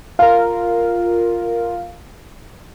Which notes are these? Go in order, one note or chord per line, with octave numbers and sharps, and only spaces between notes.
F4 A#4 F5